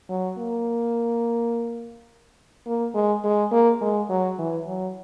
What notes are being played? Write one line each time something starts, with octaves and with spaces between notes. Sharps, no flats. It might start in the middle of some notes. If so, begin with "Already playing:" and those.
F#3
A#3
A#3
G#3
G#3
A#3
G#3
F#3
E3
F#3